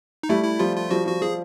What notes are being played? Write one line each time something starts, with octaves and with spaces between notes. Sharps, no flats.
D#4
G3 A3 E4
E4
F3 G3 F4
F4
F3 G3 F#4
F3 F#4
F3 G#4